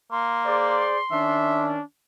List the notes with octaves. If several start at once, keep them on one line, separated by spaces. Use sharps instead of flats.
A#3 C6
G#4 C5 D5
D#3 C#4 D4 E5